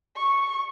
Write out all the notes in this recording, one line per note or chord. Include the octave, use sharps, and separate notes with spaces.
C#6